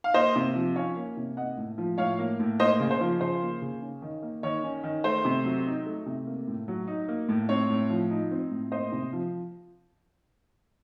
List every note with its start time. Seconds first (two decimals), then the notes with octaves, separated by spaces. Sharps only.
0.04 F5
0.14 A#3 C5 D#5
0.36 C3
0.55 F3
0.76 C#4 C#5 F5
0.96 A#3
1.17 C3
1.37 A#3 D#5 F#5
1.57 A2
1.78 F3
1.98 A2 C#5 F5
2.19 A#3
2.40 A2
2.60 A#3 C5 D#5
2.80 C#3
2.91 C5
3.01 F3
3.20 C#3 C5
3.42 A#3
3.62 C#3
3.82 C#4
4.02 D#3
4.22 A#3
4.43 D#3 C#5
4.64 C#4
4.84 D#3
5.04 A3 C5
5.25 C3
5.45 F#3
5.66 D#4
5.86 A3
6.06 C3
6.27 A#3
6.48 A2
6.68 F#3
6.88 D#4
7.08 A#3
7.29 A2
7.49 C4 C#5
7.70 A2
7.90 F3
8.10 D#4
8.31 C4
8.51 A2
8.72 A#3 C5 D#5
8.92 C3
9.13 F3